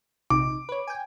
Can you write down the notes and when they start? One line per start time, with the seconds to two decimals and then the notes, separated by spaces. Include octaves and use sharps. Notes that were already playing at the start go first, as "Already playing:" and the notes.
0.30 A#1 C3 D#4 D6
0.69 B4 C#5
0.87 G5 G#5